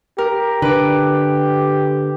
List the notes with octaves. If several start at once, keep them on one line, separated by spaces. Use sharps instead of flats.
G4 A#4
D3 B4 D6